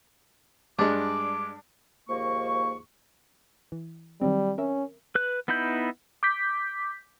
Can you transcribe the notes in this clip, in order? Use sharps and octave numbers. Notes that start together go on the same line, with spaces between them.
G2 G#3 D4 D6
D#2 G#2 F3 A#3 C#6
E3
D#3 F#3 G3 C4
C#4 A#4 E5
B4 F#6
B3 D#4 E4 B5 G6
D6 G6 B6